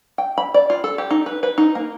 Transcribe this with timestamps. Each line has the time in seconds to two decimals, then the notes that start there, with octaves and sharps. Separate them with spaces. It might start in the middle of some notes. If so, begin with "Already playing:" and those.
0.18 G5
0.38 B5
0.54 D5
0.70 F4
0.84 A4
0.98 G4
1.11 D#4
1.26 B4
1.43 B4
1.58 D#4
1.75 A#3